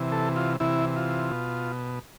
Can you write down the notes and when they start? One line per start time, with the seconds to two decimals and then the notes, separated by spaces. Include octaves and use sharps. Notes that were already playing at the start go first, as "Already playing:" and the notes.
Already playing: C3 E3
0.12 A4
0.36 F4
0.60 C3 E3 E4
0.96 F4
1.31 B2